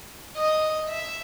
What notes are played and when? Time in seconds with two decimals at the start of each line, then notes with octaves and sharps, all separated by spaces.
0.37 D#5
0.88 E5